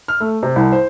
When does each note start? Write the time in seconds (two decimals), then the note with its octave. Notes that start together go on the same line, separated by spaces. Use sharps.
0.08 F6
0.20 A3
0.43 C3
0.56 C2
0.72 C5